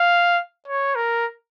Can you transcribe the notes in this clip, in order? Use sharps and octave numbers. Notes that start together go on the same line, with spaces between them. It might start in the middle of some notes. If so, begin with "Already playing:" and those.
Already playing: F5
C#5
A#4